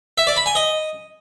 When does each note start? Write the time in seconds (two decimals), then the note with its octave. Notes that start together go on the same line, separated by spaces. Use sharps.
0.18 E5
0.27 D5
0.36 B5
0.46 G#5
0.55 D#5